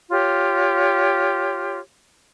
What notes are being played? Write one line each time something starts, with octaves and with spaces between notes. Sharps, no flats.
F4 G4 C#5